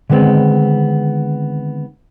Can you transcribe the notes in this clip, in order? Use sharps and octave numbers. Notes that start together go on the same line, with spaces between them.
D3 D#3 G#3 B3 C4